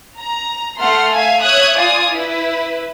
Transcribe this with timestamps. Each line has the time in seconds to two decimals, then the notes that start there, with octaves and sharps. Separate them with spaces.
0.17 A#5
0.79 A3 F#5 C6 F6
1.12 E5 F5 G#5
1.42 C#5 E5 D#6 F#6 G#6
1.77 F4 D5 F5 G#5 D#6
2.11 E4 B4